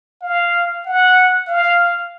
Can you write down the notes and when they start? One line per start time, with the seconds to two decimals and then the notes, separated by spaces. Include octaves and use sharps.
0.22 F5
0.85 F#5
1.48 F5